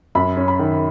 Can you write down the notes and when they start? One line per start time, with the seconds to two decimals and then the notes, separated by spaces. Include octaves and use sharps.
0.15 F#2 B5
0.37 C#4
0.48 B5
0.59 D#3